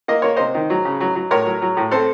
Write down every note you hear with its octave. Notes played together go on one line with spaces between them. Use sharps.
A#3 D#5
A#3 C#5
C3 C5 D#5
D#3
F#3
C#3
F#3
F#3
A2 A#4 C#5
F#3
F#3
A2
C4 A4 C5